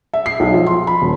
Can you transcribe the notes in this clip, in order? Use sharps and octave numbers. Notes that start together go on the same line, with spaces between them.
E5
C7
B1
F3
C6
B5
D#1